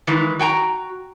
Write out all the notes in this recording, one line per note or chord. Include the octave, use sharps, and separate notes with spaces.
D#3 E3 G#3
F#4 G5 G#5 A#5